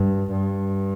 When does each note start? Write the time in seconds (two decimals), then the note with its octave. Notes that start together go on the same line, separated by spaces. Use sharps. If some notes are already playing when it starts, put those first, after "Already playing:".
Already playing: G2
0.31 G2